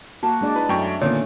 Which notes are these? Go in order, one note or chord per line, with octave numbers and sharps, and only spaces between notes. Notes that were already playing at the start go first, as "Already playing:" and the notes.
A#3 F#4 A5
G#3 D4 D5
E4 B4
F#2 A3 C#4 G5 C#6
A#2 D3 D#3 A#3 B3 C#4 C#5